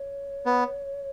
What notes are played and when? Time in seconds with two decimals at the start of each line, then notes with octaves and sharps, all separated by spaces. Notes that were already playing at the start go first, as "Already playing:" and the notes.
Already playing: C#5
0.46 B3